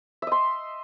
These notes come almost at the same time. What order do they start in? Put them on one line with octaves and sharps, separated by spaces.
E5 D#5 C6